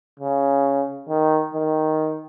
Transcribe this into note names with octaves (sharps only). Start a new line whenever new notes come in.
C#3
D#3
D#3